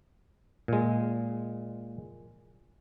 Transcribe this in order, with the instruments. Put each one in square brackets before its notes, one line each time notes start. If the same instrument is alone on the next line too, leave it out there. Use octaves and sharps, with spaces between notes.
[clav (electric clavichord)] A#2 G#3